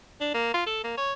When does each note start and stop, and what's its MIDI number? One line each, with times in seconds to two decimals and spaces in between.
0.21 0.33 62
0.34 0.54 58
0.54 0.63 65
0.66 0.84 69
0.84 0.97 58
0.97 1.13 73